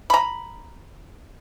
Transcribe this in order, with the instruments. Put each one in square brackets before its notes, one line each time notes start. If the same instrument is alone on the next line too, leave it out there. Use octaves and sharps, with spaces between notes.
[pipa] A#5 B5